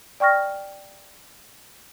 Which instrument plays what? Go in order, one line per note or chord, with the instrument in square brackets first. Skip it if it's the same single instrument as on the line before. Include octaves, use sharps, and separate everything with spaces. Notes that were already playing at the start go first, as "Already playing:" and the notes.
[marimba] D5 G5 C#6 F6 A#6